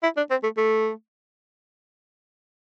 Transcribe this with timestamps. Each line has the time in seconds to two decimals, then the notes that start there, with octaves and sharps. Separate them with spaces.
0.03 E4
0.17 D4
0.30 C4
0.43 A3
0.57 A3